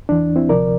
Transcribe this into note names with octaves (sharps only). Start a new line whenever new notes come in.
E2 E3 D4
C4 E4
D2 C3 F3 A#4 D5